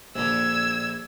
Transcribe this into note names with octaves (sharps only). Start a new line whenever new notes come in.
A#1 D3 E6 G#6